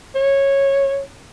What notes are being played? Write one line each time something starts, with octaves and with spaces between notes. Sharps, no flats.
C#5